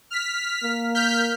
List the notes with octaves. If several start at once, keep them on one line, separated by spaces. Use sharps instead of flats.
F6 B6
A#3
F6 G6 B6